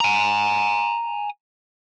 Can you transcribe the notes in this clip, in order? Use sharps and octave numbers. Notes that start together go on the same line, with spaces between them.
G#5 A#5